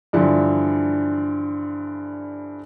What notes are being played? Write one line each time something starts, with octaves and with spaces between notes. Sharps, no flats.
G2 D3 E3 F3